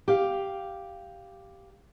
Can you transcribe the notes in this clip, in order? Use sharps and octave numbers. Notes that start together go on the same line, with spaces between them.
G4 F5